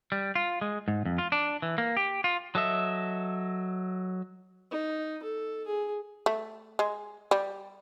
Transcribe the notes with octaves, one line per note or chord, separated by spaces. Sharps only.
G3
F4
G#3
G#2
F2
F4
D4
E3
A#3
G4
F4
F#3 A4 D#5 E5
D#4
A4
G#4
A3
G#3
G3